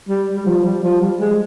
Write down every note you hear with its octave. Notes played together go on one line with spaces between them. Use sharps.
G3
G3
F3
G3
F3
G3
G#3